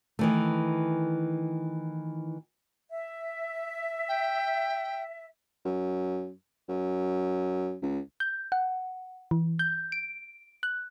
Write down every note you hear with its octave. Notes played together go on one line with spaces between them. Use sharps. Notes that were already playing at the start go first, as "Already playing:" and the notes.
D#3 E3 A3
E5
G5
F#2
F#2
C#2
G6
F#5
E3
G6
D7
F#6